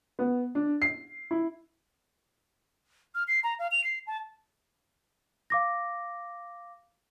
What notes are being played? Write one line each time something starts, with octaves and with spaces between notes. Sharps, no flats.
B3
D4
C7
E4
F6
C7
A#5
F5
F7
C7
A5
F5 D6 A#6